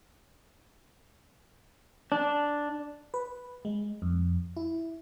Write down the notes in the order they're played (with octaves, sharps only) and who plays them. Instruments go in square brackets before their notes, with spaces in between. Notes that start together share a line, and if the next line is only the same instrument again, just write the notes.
[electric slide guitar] D4
[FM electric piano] B4
G#3
F2
E4